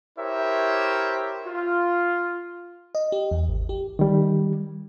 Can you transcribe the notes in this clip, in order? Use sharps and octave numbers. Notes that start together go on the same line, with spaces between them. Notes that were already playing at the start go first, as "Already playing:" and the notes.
E4 G4 A#4 C5 C#5 E5
F4
D#5
G4
E2
G#1
G4
D#3 G3